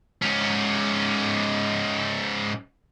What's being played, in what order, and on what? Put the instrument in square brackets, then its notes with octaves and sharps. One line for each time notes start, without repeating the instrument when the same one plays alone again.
[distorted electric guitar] G#2 C#4